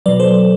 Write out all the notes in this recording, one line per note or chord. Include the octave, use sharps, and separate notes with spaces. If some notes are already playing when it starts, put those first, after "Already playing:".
B2 F#3 B4 D5
A4 C5